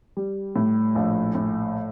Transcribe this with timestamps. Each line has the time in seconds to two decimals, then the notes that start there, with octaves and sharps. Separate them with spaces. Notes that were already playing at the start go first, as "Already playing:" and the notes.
0.17 G3
0.56 A2
0.95 A#1
1.35 A2